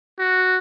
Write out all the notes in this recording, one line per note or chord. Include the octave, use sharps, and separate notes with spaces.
F#4